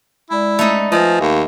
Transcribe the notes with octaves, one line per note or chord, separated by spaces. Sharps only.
G#3 E4 D5 B5
A3 D#4
F3 B4 D#5 G#5
D#2 F5